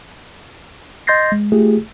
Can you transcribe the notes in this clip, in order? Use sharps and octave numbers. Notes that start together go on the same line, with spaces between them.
D#5 C6 G6 A6 A#6 C7
G#3
A3 F4 G4 G#4